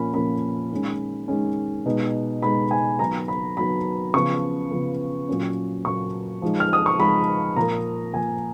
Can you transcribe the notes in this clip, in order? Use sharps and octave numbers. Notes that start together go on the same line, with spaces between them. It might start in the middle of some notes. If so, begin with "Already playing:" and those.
Already playing: A#2 F3 A#3 C#4 B5
A#2 F3 A#3 C#4 B5
D#3 G#3 C#4
D#3 G#3 C#4
B2 G#3 D#4
B2 G#3 D#4 B5
G#5
D#3 F#3 B3 A#5
B5
D#3 F#3 B3 B5
C#3 F3 B3 C#6
C#3 F3 B3
A#2 F#3 A#3 C#4
A#2 F#3 A#3 C#4 C#6
F3 G#3 D#4
F6
D#6
C#6
F3 G#3 D#4 B5
A#2 F3 A#3 A#5
A#2 F3 A#3 G#5